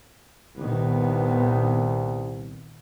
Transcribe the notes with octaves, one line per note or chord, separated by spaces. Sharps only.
C2 A#2 D#3 B3